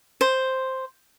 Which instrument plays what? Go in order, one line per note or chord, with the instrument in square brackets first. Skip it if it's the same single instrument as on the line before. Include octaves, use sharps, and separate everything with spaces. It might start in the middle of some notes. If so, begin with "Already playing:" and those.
[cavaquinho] C5